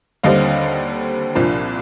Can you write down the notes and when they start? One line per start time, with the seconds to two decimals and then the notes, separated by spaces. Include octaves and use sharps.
0.23 D#2 D3 G3 C4 D#5 F5
1.35 C2 A#2 F3 A#3 D4